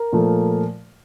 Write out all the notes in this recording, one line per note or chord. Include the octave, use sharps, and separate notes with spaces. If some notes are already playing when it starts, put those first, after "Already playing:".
Already playing: A#4
A#2 F3 A3